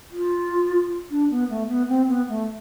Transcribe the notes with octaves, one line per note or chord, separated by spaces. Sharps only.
F4
D4
B3
A3
B3
C4
B3
A3